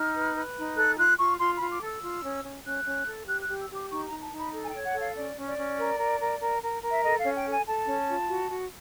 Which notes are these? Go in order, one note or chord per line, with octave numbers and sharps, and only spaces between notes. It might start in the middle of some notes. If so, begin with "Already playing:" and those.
Already playing: D#4 F6
B4
B4
D#4
A4 F#6
F4 F#6
F4 C#6
F4 C6
B5
F4
D6
A4 E6
F4
C#4
C#4
C#4 F#6
C#4
A4
G4 F#6
F#6
G4
E6
G4
D6
D#4 C#6
A#5
D#4
A5
D#4
B5
A4
G#5
G5
C#5
F#5
A4
F5
C#4 D5
C#4
D5
C#4
A#4
A#4
A#4
A#4
A#4
A#4
E5
A4 D#5
F5
C#4
G5
A4
G#5
A4 A5
C#4
F4
F#4
F#4